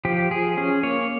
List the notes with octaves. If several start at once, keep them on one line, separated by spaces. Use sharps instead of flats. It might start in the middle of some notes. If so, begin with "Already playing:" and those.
F3 G4
F3 G#4
C#4 G#4
A#3 C#5